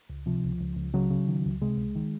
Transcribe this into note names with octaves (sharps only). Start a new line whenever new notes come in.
C#2
C3 F3
C#2
C#2
C#2
C#3 F#3
C#3
D#3
C#2
C3 G#3
C#2
D#3